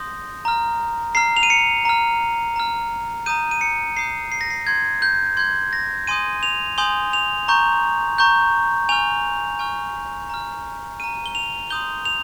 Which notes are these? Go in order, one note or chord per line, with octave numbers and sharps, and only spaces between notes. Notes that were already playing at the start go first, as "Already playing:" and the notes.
Already playing: C6 D#6 G6 A#6
A#5 F6
A#5 F6 C7
F7
D#7
C#7
A#5 F6
A#5 F6
A#5 D#6 G6 D#7
D#7
C#7
A#5 D#6 G6 C7
C7
A#6
C7
C6 G6 G#6
G6
C6 G6 G#6
A#6
G#5 C6 D#6 G6 D#7
F7
G#5 C6 D#6 G6 G7
F7
A#5 C#6 G6
A#5 C#6 G6
G#5 C#6 F6 F7
G#5 C#6 F6
A#5 F6
A#5 F6 D#7
G7
F7
C6 D#6 G6 G7
F7